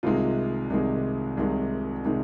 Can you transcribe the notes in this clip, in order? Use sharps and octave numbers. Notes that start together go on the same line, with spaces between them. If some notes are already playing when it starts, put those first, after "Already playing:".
C2 C3 D#3 G#3 F4
C2 C3 D#3 G#3
C2 C3 D#3 G#3
C3 D#3 G#3